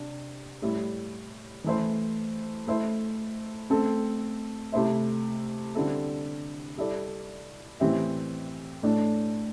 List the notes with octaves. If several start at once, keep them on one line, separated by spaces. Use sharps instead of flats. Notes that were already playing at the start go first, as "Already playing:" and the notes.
Already playing: C3 D4
A2 G3 E4
E3 A3 E4 C5
A3 E4 C5 E5
A3 C4 A4
C3 A3 E4 C5 E5
D3 G3 C4 E4 A4
G3 E4 A4 D5
A2 E3 C4 G4 E5
A2 A3 D4